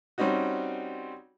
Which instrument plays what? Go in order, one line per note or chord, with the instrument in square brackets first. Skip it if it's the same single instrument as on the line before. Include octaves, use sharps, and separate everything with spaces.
[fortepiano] G3 C4 C#4 D#4 F#4